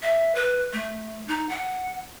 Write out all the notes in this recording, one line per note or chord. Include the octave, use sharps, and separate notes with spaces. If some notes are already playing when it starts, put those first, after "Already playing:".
E5
B4
A3
D#4
F#5